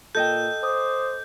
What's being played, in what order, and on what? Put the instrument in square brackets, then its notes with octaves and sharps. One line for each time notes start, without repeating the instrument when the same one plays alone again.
[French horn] A#2 [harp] A4 D#5 G5 [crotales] G6
[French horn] C5 [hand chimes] D6 D#6